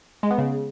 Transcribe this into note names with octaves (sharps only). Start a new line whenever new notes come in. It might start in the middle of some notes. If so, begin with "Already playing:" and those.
G#3
B3
C#3